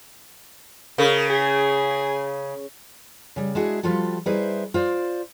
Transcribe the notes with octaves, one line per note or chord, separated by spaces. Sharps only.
C#3 A#4
G#4
C#3 G3
G#3 D4 E4 F#4 G#4
F3 G3 F4 F#4 A4
G3 D#4 E4 G#4 B4 C5
F4 C5 D5